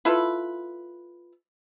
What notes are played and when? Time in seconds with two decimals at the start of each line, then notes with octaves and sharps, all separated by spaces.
0.05 E4 F4 A4 B4